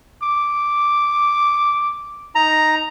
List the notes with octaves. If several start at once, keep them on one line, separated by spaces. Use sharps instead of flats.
D6
D#4 A#5